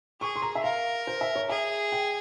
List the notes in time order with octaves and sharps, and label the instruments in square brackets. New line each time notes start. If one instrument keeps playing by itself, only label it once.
[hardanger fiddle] G#4 [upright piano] C#6
[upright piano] C6
A#5
E5
[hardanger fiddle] A#4 [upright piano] F5
[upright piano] C5
E5
C#5
[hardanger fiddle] G#4 [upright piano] E5
[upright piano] G5